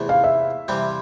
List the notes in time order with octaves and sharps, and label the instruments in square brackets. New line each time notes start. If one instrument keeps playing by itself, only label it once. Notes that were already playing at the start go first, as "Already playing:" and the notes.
Already playing: [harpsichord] E2 C3 E3 A3
[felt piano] F5
E5
[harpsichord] C3 E3 G3 C4